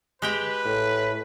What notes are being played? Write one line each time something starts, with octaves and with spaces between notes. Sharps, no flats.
G#3 G4 B4 G5
A2